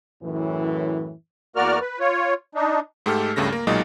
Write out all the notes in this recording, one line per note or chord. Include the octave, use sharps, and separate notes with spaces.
F#2 A2 E3
E2 A#3 F#4 A#4 D5 F6
B4
F4 C#5
D4 D#4
G#2 A3 G4 A4 F6
C#2 G2 C#3 A3 A#6
A#3
B1 A#2 F#3 G#3 D#4